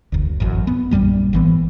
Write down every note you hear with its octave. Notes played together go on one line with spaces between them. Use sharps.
F#1 D2
A1 F#2
B3
A#1 F#2 G3 A#3
G#1 E3 B3